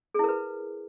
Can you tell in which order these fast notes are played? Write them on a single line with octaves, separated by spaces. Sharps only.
G#4 E4 A#4 B4